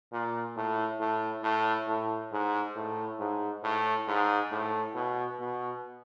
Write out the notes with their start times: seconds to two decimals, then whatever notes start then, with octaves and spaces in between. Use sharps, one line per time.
0.12 A#2
0.56 A2
1.00 A2
1.43 A2
1.87 A2
2.32 G#2
2.75 A2
3.20 G#2
3.64 A2
4.08 G#2
4.51 A2
4.95 B2
5.40 B2